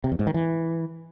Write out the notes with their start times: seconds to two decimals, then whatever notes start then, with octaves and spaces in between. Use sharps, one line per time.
0.04 C3
0.12 E2
0.19 G#2
0.27 D#3
0.34 E3